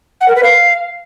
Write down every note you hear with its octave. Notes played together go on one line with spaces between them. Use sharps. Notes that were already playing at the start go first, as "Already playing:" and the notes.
F#5
A#4
B4
F5